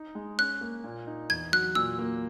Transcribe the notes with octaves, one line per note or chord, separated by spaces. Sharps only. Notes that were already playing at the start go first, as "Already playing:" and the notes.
Already playing: D#4
G#3
C#4 F#6
A#3
A#2
D#4
E2 G#6
F#3 F#6
A#2 E6
A#3